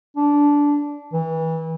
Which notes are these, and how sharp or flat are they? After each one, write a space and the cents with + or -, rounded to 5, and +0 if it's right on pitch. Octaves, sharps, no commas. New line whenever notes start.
D4 -15
E3 -30